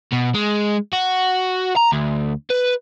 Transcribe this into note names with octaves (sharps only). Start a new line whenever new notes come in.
B2
G#3
F#4
A#5
D2
B4